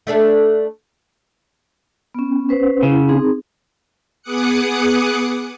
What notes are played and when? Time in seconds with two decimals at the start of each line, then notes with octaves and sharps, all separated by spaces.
0.07 A3 D4 A4
2.15 B3 C#4
2.49 C#4 B4 C5
2.83 C#3 E4
3.09 C4 D#4 G#4
4.22 B3 G#4 D6 D#6 F#6 C#7